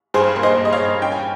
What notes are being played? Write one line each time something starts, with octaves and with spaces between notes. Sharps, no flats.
G2 G#4 C5
A#3
C5 D#5
G2
D#5
C#5 F5
G2
C#4 G5
G#5